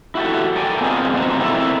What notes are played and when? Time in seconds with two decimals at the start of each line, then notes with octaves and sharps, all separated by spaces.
0.15 E4 F#4 G4 A4
0.56 A4 A#4 D5 G5 G#5
0.81 B3 C4 F4 G#4 C5 D#5
1.13 F2 B2 C4 D4 D#4
1.40 C4 E4 A4 A#4 D#5 E5